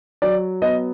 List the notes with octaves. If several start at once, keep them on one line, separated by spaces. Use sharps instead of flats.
F#3 D5
B3 D#5